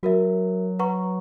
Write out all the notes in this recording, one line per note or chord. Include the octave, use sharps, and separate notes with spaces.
F#3 F#4 A#4 E5
B4 F#5 A#5 C#6